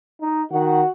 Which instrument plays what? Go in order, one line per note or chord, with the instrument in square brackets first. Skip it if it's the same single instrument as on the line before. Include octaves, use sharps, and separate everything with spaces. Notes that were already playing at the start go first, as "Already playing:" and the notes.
[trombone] D#4
[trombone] D#3 [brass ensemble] F#4 F#5